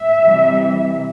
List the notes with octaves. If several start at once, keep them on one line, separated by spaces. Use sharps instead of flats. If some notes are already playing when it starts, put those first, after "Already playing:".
Already playing: E5
C3 E3 G3